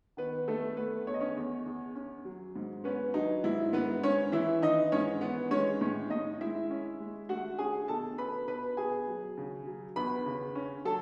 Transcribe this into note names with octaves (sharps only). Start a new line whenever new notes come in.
D#3 B3 B4
E2 A3 A4
A3 B3 B4
E2 C#5
D#5
C#4 C#5
E2
E2
C#4
F#3
G#2
B3 C#4 B4
F#3 D#4
G#2 E4
G#2 B3 B4
G#2 C#4 C#5
E3 E4 E5
E3 D#4 D#5
G#2 C#4 C#5
E3 B3 B4
G#3 C#4 C#5
A2 C#4 C#5
A2 D#4 D#5
G#3 E4 E5
C#4
G#3
A3 F#4 F#5
C#4 G#4 G#5
B2 A4 A5
C#4 B4 B5
B2 B4 B5
B2 G#4 G#5
F#3
C#3
F#3
E2 B4 B5
C#3
C#4
F#3 A4 A5